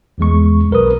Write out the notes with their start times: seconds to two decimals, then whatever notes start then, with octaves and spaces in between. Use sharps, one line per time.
0.18 A#1 E2 G#3 C#6
0.71 B1 A#4 B4 D#6